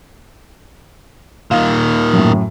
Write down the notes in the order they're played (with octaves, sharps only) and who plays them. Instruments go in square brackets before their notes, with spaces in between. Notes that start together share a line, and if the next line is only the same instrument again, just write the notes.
[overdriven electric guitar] A#2 D#3 [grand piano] F5
[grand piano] F#2 A2